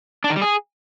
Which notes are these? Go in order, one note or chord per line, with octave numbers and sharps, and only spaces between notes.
D4
D#3
G3
G#4